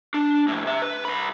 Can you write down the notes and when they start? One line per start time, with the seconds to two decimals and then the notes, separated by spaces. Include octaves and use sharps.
0.14 D4
0.48 A2 F3
0.65 C3 E5
0.82 B4
1.05 C2 B5